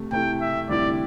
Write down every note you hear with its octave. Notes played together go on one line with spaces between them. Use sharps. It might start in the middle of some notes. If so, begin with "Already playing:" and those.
Already playing: C3 A3
C3 A3 E4 G5
E5
D2 C3 G3 E4 G4 D5